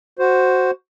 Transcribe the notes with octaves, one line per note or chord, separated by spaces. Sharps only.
F#4 C5